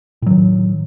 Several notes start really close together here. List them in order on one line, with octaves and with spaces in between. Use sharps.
A2 F#3 D#3